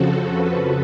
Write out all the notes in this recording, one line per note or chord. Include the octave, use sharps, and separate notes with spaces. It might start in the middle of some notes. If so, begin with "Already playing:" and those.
Already playing: F2 C#3 F3 F#4 A4
B4